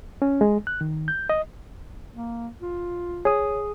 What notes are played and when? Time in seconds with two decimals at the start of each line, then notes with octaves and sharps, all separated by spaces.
0.22 C#4
0.41 G#3
0.67 F#6
0.81 D#3
1.08 G6
1.29 D#5
2.15 A#3
2.60 F4
3.25 G#4 C#5 D#6